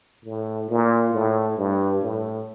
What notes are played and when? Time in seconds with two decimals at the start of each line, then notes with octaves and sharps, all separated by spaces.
0.25 A2
0.69 A#2
1.14 A2
1.58 G2
2.02 A2